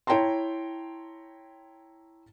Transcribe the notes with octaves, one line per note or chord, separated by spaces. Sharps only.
E4 C#5 G5 A5 A#5 C6